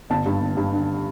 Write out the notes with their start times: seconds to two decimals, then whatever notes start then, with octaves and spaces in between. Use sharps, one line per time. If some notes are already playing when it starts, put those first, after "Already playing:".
0.10 G1 A5
0.26 G2
0.41 G1
0.57 G2
0.73 D3